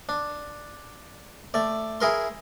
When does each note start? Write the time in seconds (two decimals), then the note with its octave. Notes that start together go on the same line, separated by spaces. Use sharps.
0.09 D4
1.54 A3 D5
2.01 E4 G#4 A#4 C6